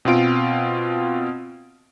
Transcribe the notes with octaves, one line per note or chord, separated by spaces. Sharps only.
B2 C4 F4 D7